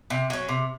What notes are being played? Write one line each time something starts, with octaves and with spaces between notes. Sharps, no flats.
C3
F#3 C#4
C3